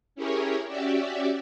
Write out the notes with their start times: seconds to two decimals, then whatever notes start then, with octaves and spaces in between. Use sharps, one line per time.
0.15 C#4 E4 G4 G#4 A#4 C#5
0.67 C#4 F#4 G4 D5 E5